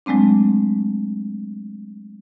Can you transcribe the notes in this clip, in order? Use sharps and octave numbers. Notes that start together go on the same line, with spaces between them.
F#3 G#3 A3 C4 D4